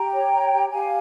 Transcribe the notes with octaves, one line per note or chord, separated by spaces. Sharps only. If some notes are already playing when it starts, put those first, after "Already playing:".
Already playing: G4 G5 A#5
C#5
C#5
G4
G4 F5 G#5